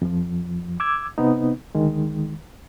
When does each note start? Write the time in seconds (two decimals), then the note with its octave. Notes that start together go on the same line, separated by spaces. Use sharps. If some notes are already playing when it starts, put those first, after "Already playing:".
0.02 F2 F3
0.80 D6 E6 G#6
1.18 C3 B3 C4 D#4
1.75 D2 D#3 G#3